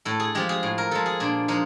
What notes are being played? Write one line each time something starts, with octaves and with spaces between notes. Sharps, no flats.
A2 A4
G#4
F3 G#3 G4
G#4
A2
A#4
F3 G#3 A4
G#4
A#2 D4
F3 G#3 D#4